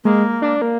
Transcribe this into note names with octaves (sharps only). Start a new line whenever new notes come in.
G#3 A#3
D4
A#3